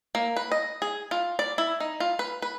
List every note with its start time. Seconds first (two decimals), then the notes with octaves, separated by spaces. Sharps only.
0.15 A#3
0.36 B4
0.52 D#5
0.82 G#4
1.11 F4
1.39 D5
1.58 E4
1.80 D#4
2.00 F4
2.19 B4
2.42 B4